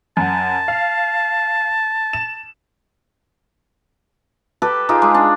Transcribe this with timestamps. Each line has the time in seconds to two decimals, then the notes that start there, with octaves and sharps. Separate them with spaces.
0.17 F#2 F#5 A5
0.68 F5
2.13 E7
4.62 G4 A4 B4
4.89 D#4 F4 G4 G#4
5.02 G#3
5.14 D4